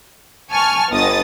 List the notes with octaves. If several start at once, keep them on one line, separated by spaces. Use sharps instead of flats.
G#5 A5 C#6 F6
G1 D#5 D#6 A6